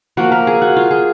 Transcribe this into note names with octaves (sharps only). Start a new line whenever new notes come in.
F3 A#3 F#4
A#4
G#4
F#4
F4
G#4